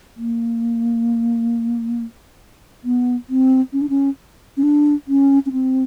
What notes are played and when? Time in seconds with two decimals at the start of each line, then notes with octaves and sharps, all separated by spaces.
0.17 A#3
2.84 B3
3.29 C4
3.73 C#4
3.81 D4
3.89 C#4
4.57 C#4
4.63 D4
5.08 C#4
5.46 C#4
5.52 C4